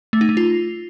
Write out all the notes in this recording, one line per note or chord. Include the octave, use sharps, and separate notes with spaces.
A3
D#4
A3
F4